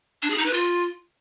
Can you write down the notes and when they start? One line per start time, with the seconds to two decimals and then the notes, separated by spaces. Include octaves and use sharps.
0.23 D4
0.30 G#4
0.38 D#4
0.46 B4
0.54 F4